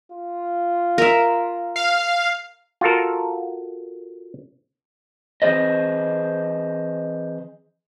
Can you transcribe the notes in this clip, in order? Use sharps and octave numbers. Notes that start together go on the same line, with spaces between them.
F4
A#4 E5
F5
F4 F#4 A4 A#4
E3 C4 G#4 C5 D#5